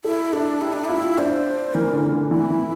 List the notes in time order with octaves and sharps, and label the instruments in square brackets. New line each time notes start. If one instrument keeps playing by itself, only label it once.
[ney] E4 [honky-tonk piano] A4
[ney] D4 [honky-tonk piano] A4
[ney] E4 [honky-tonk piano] G4
[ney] D4
[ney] E4 [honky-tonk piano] F4
[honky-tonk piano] D4 [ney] C5
[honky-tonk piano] E3 [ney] A#4
[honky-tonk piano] D3
D3
[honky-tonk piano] E3 [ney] E4
[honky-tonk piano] E3